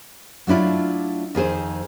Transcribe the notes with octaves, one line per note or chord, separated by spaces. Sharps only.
F#3 A3 D4 E4 F4
F2 D#3 G#4 C5